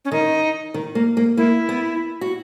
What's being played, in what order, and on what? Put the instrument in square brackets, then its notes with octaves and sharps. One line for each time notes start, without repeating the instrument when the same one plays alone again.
[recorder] C#4
[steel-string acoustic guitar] D#3 [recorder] D#4
[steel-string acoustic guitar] D#3
A#3
A#3
[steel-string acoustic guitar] A#3 [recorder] E4
[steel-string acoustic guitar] B3
F#4